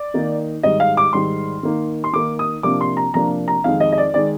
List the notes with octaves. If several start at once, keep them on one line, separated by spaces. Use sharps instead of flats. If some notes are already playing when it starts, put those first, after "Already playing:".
Already playing: D5
D#3 A#3 D#4
G#2 D#3 G3 D#5
F5
D6
G#2 D#3 G3 C6
D#3 A#3 D#4
C6
D#3 A#3 D#4 D6
D#6
C3 F3 A#3 D4 D6
C6
A#5
C3 F3 A#3 D4 A#5
A#5
F2 D#3 G#3 F5
D#5
D#5
D5
D#3 G#3 D5